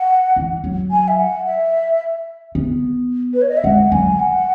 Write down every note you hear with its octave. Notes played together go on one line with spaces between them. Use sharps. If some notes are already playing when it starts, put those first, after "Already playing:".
Already playing: F#5
E3
F#3
G#5
E5
F#5
E5
B3
B4
C#5
D#5
E5
G#3 F#5
F#3 G#5
F#5